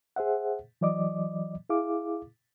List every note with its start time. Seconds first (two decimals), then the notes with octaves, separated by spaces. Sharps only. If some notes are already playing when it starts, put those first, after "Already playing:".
0.16 G#4 C5 E5 F#5
0.81 E3 F#3 D5 D#5 D6
1.70 E4 G#4 F5 D6